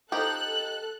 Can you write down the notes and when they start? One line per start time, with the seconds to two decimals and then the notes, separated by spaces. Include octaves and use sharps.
0.12 F3 D#4 G4 A4 F#6